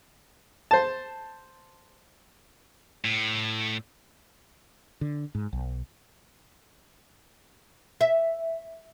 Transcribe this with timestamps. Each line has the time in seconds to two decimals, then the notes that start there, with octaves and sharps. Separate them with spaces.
0.71 C5 A5
3.05 A2
5.01 D3
5.35 G#2
5.53 B1
8.01 E5